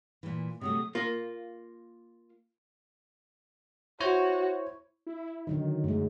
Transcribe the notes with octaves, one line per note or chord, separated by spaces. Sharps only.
A#2 E3
C3 F#3 A3 D#6
A#3 F4
E4 F#4 C5 C#5
E4
D3 D#3 F#3 D#4
F#2 G#3 A3